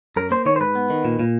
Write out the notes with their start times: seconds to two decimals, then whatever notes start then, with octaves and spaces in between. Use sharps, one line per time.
0.16 F#2 A#4
0.31 A#3 C5
0.46 D#3 C#5
0.56 C5
0.60 G#2 B4
0.75 B3
0.90 D#3
1.05 A#2
1.20 A#2